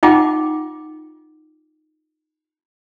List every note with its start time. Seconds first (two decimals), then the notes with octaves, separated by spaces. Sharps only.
0.03 D#4 F4 F#5 G5 D6